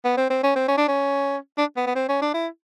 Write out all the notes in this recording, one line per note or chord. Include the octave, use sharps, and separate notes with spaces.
B3
C4
C4
C#4
C4
C#4
D4
C#4
D4
B3
B3
C4
C#4
D4
E4